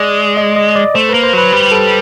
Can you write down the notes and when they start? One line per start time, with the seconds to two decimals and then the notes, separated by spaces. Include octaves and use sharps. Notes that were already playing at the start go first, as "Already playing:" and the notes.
Already playing: G#3 D5
0.37 D#5
0.56 D#5
0.75 D5
0.94 A3 C5
1.09 A#3 B4
1.23 C5
1.33 F#3 B4
1.52 G3
1.72 A4